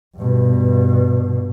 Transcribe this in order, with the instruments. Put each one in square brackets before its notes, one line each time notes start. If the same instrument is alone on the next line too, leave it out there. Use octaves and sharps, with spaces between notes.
[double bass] G2 B2